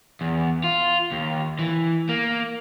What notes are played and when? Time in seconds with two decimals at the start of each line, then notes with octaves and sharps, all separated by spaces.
0.21 E2
0.64 F4
1.11 D#2
1.59 E3
2.09 A#3